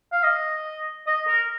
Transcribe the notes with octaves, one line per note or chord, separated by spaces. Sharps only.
F5
D#5
D#5
A#4